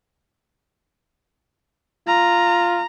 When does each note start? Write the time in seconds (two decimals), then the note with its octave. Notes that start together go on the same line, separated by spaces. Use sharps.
2.07 F4 A#5